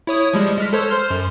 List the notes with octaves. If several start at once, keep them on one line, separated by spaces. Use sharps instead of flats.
E4 C#5 D#6
F3 G3 G#3
G#3 F6 B6
A4 C5 C#5
C5 C6 F6
F#2